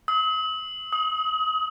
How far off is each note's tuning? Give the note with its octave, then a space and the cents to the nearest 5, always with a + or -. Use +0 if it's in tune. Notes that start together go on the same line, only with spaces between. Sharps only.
D#6 +45
D#6 +25